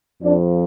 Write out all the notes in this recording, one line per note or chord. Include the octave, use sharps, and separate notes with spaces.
F2 F3 D4